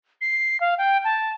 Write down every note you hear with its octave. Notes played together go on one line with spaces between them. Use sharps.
C7
F5
G5
A5